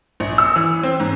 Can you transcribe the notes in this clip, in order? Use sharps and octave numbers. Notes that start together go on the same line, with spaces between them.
A#1
E6
E3
C4
G#2